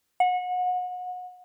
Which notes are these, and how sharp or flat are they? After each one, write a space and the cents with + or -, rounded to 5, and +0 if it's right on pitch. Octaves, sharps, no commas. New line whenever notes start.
F#5 -30